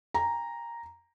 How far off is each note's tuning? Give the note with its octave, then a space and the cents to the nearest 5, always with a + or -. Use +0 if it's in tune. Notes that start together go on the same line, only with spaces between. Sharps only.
G5 +45 A#5 +0